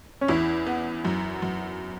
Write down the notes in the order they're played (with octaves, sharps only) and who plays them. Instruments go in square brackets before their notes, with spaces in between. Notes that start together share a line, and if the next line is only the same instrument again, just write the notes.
[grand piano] C#4
[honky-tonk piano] E2 [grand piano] E4
[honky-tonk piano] B3
F#2
F#2